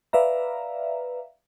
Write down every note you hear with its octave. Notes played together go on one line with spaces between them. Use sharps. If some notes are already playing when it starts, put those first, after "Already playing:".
B4 D5 E5 F5 A#5